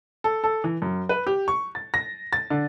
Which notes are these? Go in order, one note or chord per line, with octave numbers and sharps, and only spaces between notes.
A4
A4
E3
F#2
B4
G4
C#6
A6
A#6
A6
D3